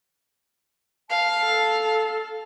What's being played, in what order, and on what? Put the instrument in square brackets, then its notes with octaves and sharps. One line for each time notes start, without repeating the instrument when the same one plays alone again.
[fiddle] F5 [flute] A5
[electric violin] A4